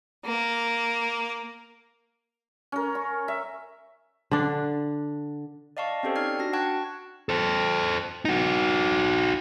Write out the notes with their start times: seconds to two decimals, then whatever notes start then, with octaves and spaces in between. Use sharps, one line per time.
0.25 A#3
2.72 C#4 A#4
2.95 C#6
3.28 E5
4.31 D3 D4
5.77 D5 D#5 F5 A5 C#6
6.03 C4 C#4 G4 A4 C5
6.16 D#4 D5 F6 G#6 C7
6.39 D4 F#4 A#6
6.53 F#5 G5 A5 C#6 F#6 G#6
7.29 A4 C5
8.25 D#4 F#4